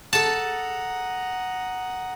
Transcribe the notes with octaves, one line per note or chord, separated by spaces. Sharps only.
A4 F#5 A5 A#5 D#6